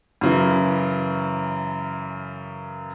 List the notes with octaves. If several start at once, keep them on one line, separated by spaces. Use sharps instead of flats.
F#2 C#3 E3